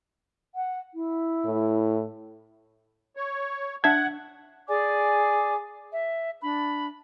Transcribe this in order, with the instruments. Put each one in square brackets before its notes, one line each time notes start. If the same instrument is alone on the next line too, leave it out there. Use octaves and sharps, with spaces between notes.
[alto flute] F#5
E4
[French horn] A2
[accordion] C#5
[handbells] D4 E5 A5 [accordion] F#5 [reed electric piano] G#6
[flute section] G#4 D5 G#5 D6
E5
D4 B5